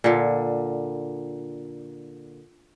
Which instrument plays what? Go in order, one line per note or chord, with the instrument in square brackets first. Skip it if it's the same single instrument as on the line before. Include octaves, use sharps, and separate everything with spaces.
[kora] A#2 D3